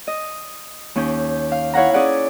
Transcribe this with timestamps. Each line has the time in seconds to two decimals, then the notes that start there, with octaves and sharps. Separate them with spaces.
0.07 D#5
0.95 D#2 C#4 G6
1.51 F5
1.74 E4 C#5 F5 F#5 A#5
1.94 C#4 G#4 D5 F#5